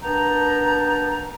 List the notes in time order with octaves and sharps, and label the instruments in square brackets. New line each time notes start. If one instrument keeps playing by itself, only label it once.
[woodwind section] B3 D4 A#4 G5 A5 A#5